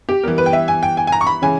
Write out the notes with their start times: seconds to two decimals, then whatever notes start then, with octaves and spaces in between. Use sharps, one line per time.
0.09 G4
0.23 E3 G3 B3 A#4
0.38 B4
0.46 G5
0.53 E5
0.68 G#5
0.83 G5
0.97 G#5
1.07 G#5
1.12 A#5
1.21 C#6
1.27 B5
1.42 C#3 E3 G#3 C#4 G#5